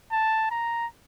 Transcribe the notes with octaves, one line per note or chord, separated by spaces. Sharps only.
A5
A#5